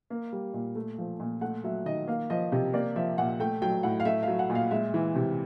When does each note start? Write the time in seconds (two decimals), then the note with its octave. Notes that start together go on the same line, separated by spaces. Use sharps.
0.10 A#3
0.33 G3
0.54 A#2
0.76 A3
0.98 F3
1.20 A#2
1.41 A3 F#5
1.64 F#3 E5
1.86 D#3 D#5
2.07 A#3 F5
2.30 F3 D#5
2.52 C3 D#5
2.73 A#3 D5
2.96 F3 E5
3.18 A#2 F#5
3.40 A3 G5
3.62 F#3 G5
3.83 A2 F#5
4.00 F5
4.05 A3 E5
4.23 F#3 F5
4.39 F#5
4.50 A#2
4.55 F5
4.71 G#3 E5
4.94 E3
5.16 C3